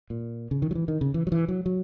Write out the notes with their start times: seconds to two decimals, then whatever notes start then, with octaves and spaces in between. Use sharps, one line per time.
0.10 A#2
0.51 C#3
0.62 D#3
0.71 F#3
0.75 E3
0.88 D#3
1.01 C#3
1.14 E3
1.27 F#3
1.32 E3
1.48 F#3
1.66 F#3